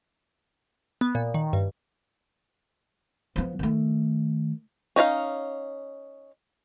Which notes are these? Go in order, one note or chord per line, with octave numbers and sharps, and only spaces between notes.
B3
A#2
D#3
G2
F3 B3
D#3 A3
C#4 D#4 F4 F5